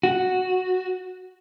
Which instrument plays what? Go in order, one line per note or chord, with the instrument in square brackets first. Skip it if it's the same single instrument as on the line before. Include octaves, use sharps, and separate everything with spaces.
[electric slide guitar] F#4